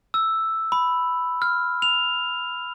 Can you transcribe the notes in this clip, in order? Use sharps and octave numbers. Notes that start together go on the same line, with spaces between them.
E6
B5
F6
F7